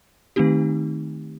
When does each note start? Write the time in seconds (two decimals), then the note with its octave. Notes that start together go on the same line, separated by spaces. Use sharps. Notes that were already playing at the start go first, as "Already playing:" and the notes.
0.36 D#3 A3 C4 D#4 G4